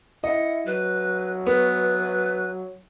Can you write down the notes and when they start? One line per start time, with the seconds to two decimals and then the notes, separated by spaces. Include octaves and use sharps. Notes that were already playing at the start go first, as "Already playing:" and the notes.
0.24 E4 D#5 F#5
0.67 F#3 B4
1.47 B3 B4